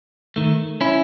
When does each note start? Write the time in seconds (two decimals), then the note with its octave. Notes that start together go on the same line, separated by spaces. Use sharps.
0.36 D#3 A3
0.81 C#4 E4